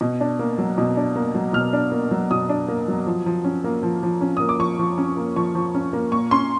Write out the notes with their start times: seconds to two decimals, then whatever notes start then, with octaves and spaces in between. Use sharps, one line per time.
0.01 B2
0.20 D4
0.39 A#3
0.58 F#3
0.78 B2
0.97 D4
1.16 A#3
1.35 F#3
1.53 B2 F6
1.73 D4
1.92 A#3
2.11 F#3
2.31 B2 D#6
2.49 D4
2.69 A#3
2.88 F#3
3.07 F3
3.26 F3
3.44 C#4
3.64 A#3
3.83 F3
4.03 F3
4.21 C#4
4.37 A#3 D#6
4.49 D6
4.59 F3 C#6
4.79 F3
4.98 C#4
5.17 A#3
5.36 F3 C#6
5.55 F3
5.75 C#4
5.93 A#3
6.12 A#2 C#6
6.31 C#4 C6